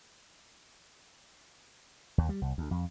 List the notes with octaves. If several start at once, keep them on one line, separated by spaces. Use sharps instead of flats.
D#2
G3
C2
D2
F2